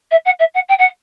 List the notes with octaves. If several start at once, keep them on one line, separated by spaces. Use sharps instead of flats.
E5
F#5
E5
F#5
G5
F#5